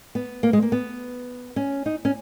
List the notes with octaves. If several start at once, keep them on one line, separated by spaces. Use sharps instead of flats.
B3
A#3
G#3
A#3
B3
C#4
D#4
C#4